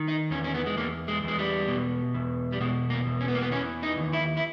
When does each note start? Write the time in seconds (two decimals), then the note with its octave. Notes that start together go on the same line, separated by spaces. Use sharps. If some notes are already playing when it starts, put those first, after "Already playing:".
Already playing: D#3
0.08 D#4
0.31 E2 C#4
0.44 C#4
0.54 B3
0.66 G#3
0.77 E2 A#3
1.08 G#3
1.23 E2 G#3
1.39 G3
1.68 B2
2.14 E2
2.52 G3
2.61 B2 G#3
2.90 A#3
3.06 E2
3.21 C#4
3.28 B3
3.35 A#3
3.43 B3
3.52 E3 C#4
3.83 D#4
3.98 D#2
4.13 E4
4.37 E4